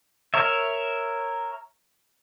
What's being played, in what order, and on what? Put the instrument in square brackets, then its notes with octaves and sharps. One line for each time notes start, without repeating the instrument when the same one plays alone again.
[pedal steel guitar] A#4 C#5 E5